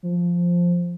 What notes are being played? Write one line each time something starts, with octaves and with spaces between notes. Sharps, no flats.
F3